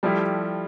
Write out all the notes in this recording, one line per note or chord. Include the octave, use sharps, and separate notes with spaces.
F3 G3 A3 E4 G4